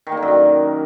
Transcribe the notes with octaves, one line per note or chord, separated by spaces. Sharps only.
D#3
A#3
D3
F#2
D#3